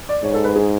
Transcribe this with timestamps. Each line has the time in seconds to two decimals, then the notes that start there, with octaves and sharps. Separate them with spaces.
0.09 D5
0.23 G#2 C#5
0.34 A4
0.45 B4
0.56 G#4